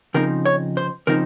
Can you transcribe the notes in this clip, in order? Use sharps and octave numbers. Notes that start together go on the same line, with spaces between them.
C#3 F3 C4 D#4 A#4
C#5
C5
C#3 F3 C4 D#4 A#4